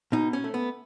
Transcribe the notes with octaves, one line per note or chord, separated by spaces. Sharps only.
B2 D#4
C#4
A3
B3